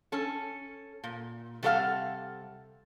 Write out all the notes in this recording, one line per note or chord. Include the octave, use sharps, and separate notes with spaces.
C#4 A4
A#2
C3 G3 A4 C#5 F5 F#5